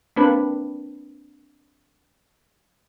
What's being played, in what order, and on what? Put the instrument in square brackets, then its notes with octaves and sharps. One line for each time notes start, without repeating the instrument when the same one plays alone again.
[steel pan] A#3 C4 D4 B4